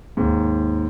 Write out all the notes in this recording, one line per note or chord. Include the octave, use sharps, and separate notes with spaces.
D#2 G#2